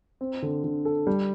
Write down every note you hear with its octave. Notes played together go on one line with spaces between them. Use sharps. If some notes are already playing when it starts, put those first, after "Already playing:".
C4
D3
D3
A4
G3